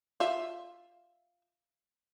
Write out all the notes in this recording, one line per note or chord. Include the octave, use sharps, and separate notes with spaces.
F4 E5